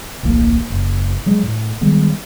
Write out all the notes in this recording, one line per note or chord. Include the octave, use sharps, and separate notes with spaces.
D1 A#1 E3 A#3
F#1
F#3 G#3
A2
D#3 G3 G#3 B3